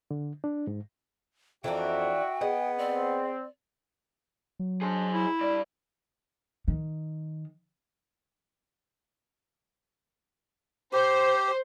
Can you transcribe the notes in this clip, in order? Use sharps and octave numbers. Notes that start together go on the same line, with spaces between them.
D3
D4
G#2
F2 E3 A#3 D4 F#4 E5 G5
B3 G#4 D#5 F#5
C4 D5
F#3
D4 G#4 C5
E4
G2 D5
D#3
G4 C5